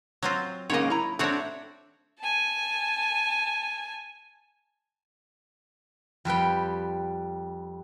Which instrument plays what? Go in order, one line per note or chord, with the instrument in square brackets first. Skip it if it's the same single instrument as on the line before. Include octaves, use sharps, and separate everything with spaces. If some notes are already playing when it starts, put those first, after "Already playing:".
[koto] F#3 C4 F4
[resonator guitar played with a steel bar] G#2 C#3 A#3 [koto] C#5 D#5
[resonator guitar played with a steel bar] E4 A#5
[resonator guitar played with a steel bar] A3 D4 [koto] C4 F#4 C#5
[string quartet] G#5 A5
[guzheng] F2 G3 B4 G5